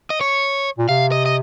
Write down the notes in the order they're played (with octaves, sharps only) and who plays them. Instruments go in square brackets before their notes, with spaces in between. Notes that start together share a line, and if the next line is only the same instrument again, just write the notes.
[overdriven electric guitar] D#5
C#5
[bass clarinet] A#2
[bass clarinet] C3 [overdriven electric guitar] F5
[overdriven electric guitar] D#5
D#5